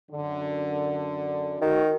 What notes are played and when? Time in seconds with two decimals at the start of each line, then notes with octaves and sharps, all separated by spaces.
0.12 F#2 D3
1.61 D#3 F#4